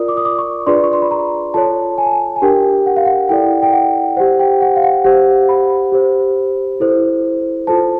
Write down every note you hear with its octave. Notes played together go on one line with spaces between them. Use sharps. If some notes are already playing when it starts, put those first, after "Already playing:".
Already playing: F4 A#4 D5 D#6
D6
D#6
D6
C#6
D4 F4 G#4 B4 D5 C6
C#6
C6
B5
A#5
F4 A4 C#5 A5
G#5
A5
G#5
G#5
D4 G4 A#4 G5
F#5
F5
F#5
E4 A4 D5 G5
G5
F#5
G4 C5 F#5
G5
F#5
F5
F#5
G4 C5 F#5
B5
G4 C5
E4 A4 C5
F4 A4 C5 A5